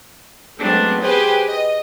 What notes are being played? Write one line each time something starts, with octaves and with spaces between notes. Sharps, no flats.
F#3 G#3 A3 B3 C4 D4
G4 G#4 B4 C5 G#5
D#5